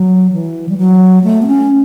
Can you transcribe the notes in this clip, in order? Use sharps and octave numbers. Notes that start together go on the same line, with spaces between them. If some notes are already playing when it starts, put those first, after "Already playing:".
Already playing: F#3
E3
G3
F#3
A3
B3
C#4